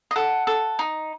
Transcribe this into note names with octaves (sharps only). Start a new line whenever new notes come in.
D#5
A4 F#5
A4
D#4